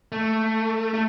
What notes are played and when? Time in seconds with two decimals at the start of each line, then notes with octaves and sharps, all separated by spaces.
0.12 A3
0.94 A3